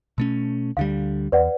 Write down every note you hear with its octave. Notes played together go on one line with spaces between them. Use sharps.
B2 A3 C#4
D2 D3 G3 F5
E2 B4 D5 F#5